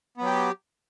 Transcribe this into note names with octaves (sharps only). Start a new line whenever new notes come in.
F#3 B3 G4